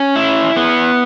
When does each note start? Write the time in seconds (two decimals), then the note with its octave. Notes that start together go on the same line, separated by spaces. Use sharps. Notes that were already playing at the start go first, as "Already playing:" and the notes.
Already playing: C#4
0.16 E4
0.56 B3